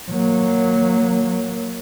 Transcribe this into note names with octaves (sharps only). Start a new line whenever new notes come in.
F#3 A#3